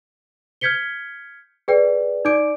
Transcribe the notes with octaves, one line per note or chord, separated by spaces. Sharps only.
F6 G6 G#6 B6 C#7 G7
G#4 B4 D5 G5
D#4 D5 D6 G6 D7